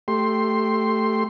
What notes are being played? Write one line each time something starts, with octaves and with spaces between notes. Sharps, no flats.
A3 G4 C6